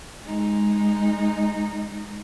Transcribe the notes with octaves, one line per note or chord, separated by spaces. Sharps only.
G#3 D#4